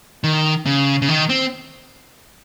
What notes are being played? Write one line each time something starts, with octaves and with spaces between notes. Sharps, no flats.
D#3
C#3
C#3
D#3
C4